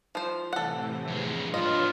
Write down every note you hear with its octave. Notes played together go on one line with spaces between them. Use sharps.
F3 C5
A2 C3 E3 A4 F#5
F2 G#3
G#2 D4 F4 B4 C#5 D#5